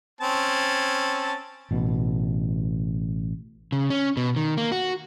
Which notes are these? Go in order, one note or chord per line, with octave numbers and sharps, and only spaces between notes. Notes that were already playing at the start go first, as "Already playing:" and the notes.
C4 C#4 A5
A1 B2
C#3
C#4
B2
D#3
A#3
F#4